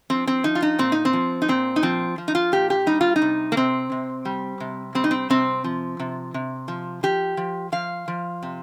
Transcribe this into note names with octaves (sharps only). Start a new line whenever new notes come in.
F3 C4
C4
F3 D#4
F4
D#4
A#2 C4
D#4
C4
F3
D#4
A#2 C4
D#4
F3 C4
F3
D#4
F4
A#2 G4
G4
G3 D#4
F4
D#4
C3
A#3
C3 C4
C3
G3
C3
G3 C4
D#4
C4
C3 C4
F3
C3
C3
F3
F3 G4
F3
F3 F5
F3
C3